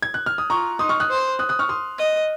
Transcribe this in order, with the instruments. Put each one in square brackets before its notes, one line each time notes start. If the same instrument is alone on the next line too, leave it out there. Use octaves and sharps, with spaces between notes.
[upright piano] G#6
F#6
F6
D#6
[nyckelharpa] F4 [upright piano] A#5 C#6
[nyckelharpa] D#4 [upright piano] C6 D#6
[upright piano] C#6 F6
D#6 F#6
[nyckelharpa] C5
[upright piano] D#6 F#6
D#6 F#6
C#6 F6
C6 D#6
[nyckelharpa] D#5